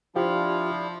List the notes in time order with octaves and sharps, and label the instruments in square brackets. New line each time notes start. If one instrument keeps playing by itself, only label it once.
[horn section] F3 [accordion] D4 E4 [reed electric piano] F4 G4